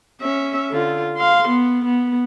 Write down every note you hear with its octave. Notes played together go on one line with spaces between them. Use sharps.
C#4 E5
D3 F4
F5 C6
B3
B3